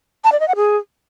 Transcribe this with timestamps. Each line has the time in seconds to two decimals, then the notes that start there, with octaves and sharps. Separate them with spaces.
0.24 A5
0.32 D5
0.40 D#5
0.48 F#5
0.56 G#4